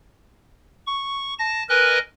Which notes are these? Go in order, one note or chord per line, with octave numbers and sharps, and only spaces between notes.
C#6
A5 A#6
A#4 B4 D#5 G#5 F#6